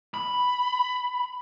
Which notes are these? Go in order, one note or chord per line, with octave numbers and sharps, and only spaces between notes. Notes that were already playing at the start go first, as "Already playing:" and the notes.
B5